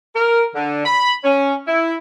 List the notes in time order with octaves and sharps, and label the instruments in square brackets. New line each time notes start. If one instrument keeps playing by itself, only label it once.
[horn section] A#4
D3
B5
C#4
E4